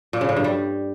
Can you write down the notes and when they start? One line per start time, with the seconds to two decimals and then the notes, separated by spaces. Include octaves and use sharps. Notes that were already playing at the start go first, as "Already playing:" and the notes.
0.13 A#2
0.21 C#3
0.29 A2
0.37 G2
0.44 G3